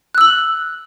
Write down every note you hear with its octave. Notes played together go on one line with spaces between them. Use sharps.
E6 F#6 F#7